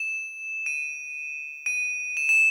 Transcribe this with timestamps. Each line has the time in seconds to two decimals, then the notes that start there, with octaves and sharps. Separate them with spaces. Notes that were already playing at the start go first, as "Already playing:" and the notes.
Already playing: E7
0.66 D#7
1.66 D#7
2.17 E7
2.29 E7